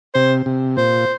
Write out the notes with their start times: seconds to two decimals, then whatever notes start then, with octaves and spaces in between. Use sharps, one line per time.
0.15 C3 C5
0.46 C3
0.77 A#2 C5